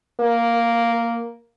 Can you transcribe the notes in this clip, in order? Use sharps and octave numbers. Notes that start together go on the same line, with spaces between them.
A#3